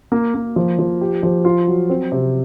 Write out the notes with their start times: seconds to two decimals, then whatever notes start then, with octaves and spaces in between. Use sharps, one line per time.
0.12 A#3
0.35 A#3
0.56 F3
0.79 F3
1.01 G4
1.23 F3
1.45 F4
1.67 F#3
1.90 C4
2.12 C3